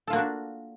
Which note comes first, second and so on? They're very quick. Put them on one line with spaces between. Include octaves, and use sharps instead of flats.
A4 F4 A#3 F#4 D4